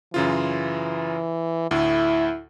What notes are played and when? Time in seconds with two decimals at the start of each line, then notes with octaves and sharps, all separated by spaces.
0.14 F#2 C#3 E3 F4
1.71 D2 A2 E4